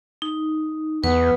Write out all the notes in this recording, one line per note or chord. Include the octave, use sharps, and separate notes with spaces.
D#4
E2 B3 B4